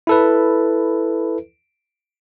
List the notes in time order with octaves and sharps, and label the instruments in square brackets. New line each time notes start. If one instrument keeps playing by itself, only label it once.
[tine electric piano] E4 A4 B4